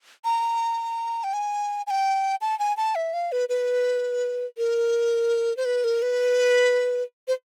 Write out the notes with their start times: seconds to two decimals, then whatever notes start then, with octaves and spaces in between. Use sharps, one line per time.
0.25 A#5
1.24 G5
1.33 G#5
1.87 G#5
1.90 G5
2.41 A5
2.59 G#5
2.77 A5
2.95 E5
3.14 F5
3.32 B4
3.49 B4
4.58 A#4
5.57 C5
5.65 B4
5.84 A#4
6.02 B4
7.28 C5